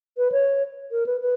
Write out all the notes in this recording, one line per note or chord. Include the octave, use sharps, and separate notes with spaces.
B4
C#5
A#4
B4
B4